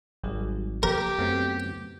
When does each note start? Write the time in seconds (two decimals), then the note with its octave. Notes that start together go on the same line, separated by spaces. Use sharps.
0.23 G#1 F#3 G3 G#4
0.83 A#3 G4 A#4
1.19 F#2 A3 B3 C4